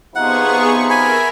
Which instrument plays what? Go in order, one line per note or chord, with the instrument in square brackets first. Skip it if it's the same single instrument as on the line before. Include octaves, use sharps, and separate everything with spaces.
[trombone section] C3 F3 D#4 [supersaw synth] B3 G#4 C#6 [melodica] F#5
[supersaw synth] A#4 E5 [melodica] G#5 B5